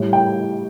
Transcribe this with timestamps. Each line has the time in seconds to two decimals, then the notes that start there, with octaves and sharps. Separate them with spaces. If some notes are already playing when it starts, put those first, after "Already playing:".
Already playing: A2 G3
0.13 G5